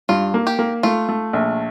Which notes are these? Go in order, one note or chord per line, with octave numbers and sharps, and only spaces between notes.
G2 F4
A#3
G4
A#3
A3 F4
A3
A#1